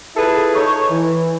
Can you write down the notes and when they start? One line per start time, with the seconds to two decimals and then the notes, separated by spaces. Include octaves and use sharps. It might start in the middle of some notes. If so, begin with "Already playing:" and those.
0.16 E4 F4 G#4 A4 B4
0.55 D#4 A4 C#5
0.90 E3